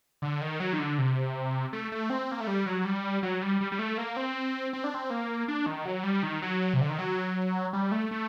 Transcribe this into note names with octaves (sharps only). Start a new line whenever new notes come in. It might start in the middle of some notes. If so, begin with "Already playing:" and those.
D3
D#3
F#3
D#3
D3
C3
A3
A3
C4
A#3
A3
G3
F#3
G3
F#3
G3
G3
G3
A3
A#3
C4
C4
D4
C4
A#3
D4
D#3
F#3
G3
D#3
F#3
C3
D3
D#3
F#3
G3
A3
A3